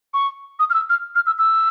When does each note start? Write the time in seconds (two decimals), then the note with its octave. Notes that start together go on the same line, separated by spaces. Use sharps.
0.14 C#6
0.59 D#6
0.70 F6
0.74 E6
0.89 F6
1.15 F6
1.27 E6
1.38 E6